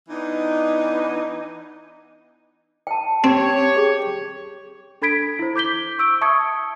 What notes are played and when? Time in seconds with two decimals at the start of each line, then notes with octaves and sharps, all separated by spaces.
0.09 E3 B3 D4 D#4
2.87 G5 A5
3.24 C4 G4 C#5
3.77 G#4
5.02 D4 A4 B5 G#6 B6 D7
5.39 E4 C5
5.56 D6 G6 B6 G7
5.99 C#6 E6 D7
6.21 E5 A5 C#6 D#6 G#6 C#7